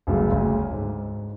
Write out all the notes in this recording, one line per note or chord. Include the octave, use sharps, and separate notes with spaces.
G1 D2 G2 C#3 F#3
D2 C#3
G#2